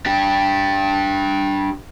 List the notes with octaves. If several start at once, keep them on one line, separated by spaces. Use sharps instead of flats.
D4 G4